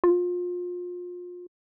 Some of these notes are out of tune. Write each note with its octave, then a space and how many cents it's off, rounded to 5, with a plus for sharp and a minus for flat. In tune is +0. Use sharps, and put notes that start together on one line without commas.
F4 +30